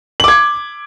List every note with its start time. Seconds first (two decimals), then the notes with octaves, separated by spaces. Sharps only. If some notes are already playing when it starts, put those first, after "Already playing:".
0.20 F#7
0.24 D6
0.28 G#6